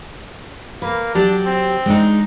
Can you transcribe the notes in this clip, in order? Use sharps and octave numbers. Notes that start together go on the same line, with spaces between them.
A#3 B4
F#3 D4 G4 D5
C4
G#3 D4 D#4